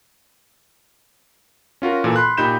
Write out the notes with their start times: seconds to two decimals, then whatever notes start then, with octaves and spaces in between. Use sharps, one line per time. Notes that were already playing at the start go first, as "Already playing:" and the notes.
1.82 C#4 F4 F#4 A#4
2.04 A#2 E3 A4
2.16 B5 C6 F#6
2.37 A#2 D#4 G4 B5 G6 E7